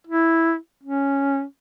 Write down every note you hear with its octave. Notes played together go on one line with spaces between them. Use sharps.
E4
C#4